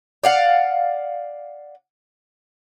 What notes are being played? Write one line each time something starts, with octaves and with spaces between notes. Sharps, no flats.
D5 F5 F#5